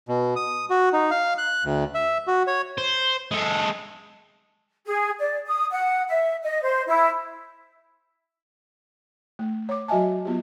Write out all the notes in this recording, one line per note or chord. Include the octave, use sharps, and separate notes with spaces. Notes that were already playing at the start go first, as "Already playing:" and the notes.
B2
D#6
F#4
D#4
F5
F#6
D2
E5
F#4
C#5
C5
G#3 A4
G#4
D5
D#6
F#5
E5
D#5
C5
E4
A3
C#5 D6
F#3 F#4 D#5 E5 G#5 A5
F#3 B3 F4 G4